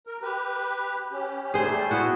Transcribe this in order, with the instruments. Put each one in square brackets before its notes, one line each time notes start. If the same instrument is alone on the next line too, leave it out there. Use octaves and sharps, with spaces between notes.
[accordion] A#4
G4 B4
C#4 G4
[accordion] G3 A3 [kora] G#4 C5
[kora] B3 E4 F#4